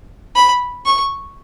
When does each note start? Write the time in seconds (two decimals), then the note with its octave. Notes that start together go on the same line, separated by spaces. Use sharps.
0.35 B5
0.86 C#6